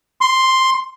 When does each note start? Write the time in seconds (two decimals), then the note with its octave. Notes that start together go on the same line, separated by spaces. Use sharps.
0.21 C6